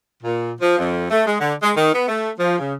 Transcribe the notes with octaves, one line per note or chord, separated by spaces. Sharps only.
A#2
F3
F2
A3
G#3
D3
G#3
D#3
B3
A3
F3
C#3